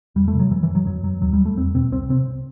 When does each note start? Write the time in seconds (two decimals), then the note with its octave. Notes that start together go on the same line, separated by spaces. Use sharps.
0.15 E2 G3
0.28 A3
0.33 C3
0.39 F#3
0.51 F#2 E3
0.63 E3
0.75 F#3
0.86 F#2 F#3
1.04 F#3
1.22 D#2 F#3
1.33 G3
1.45 A3
1.57 E2 C4
1.75 B2 C4
1.92 C2 C4
2.09 C3 C4